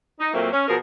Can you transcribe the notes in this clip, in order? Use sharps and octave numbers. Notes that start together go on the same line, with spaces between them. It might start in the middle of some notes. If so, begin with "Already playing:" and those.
D#4
A#2 F#3 A3 A#3 C4
C#4
B2 F3 G#4 A#4